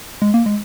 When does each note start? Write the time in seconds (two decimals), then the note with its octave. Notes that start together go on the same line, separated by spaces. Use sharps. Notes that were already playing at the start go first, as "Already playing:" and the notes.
0.22 G#3
0.34 A#3
0.46 G#3